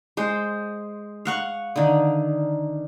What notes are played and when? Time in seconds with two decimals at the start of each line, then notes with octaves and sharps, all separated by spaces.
0.17 G#3 C5
1.25 F5 F#5 C#6
1.76 D3 D#3